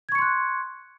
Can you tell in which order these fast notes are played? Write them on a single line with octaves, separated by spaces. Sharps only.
G#6 C#6 C#7 C6 F#6